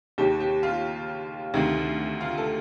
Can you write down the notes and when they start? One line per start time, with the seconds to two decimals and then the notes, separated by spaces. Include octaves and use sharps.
0.18 D#2 D#3 G4
0.40 G4
0.63 F4
1.54 D2 C3 D#3
2.21 F4
2.38 A4